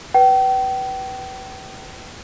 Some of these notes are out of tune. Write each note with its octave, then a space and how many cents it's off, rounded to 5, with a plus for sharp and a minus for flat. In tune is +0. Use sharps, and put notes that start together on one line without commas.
B4 +0 G5 -35